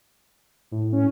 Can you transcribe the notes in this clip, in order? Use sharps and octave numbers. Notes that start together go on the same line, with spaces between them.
A2
C#4